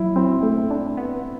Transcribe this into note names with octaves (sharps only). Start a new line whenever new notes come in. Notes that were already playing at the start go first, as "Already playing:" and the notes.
Already playing: F#3 E4
F#3 C4
A3
D4
B3